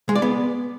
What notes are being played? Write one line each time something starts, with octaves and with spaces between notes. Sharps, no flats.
G#3
D5
B3